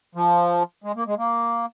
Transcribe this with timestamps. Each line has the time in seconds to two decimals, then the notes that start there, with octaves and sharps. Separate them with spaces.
0.15 F3
0.84 G#3
0.96 A#3
1.07 G#3
1.18 A#3